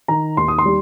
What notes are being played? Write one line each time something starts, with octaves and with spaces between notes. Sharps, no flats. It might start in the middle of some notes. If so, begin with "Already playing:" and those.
D#3 A#5
D#2 C6
D#6
C6
G3